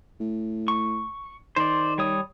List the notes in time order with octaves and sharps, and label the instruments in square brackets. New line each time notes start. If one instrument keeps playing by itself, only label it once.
[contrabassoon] A2
[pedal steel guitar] C#6
[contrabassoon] D#3 [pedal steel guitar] C5 D5
[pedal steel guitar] G3 C#5 D#6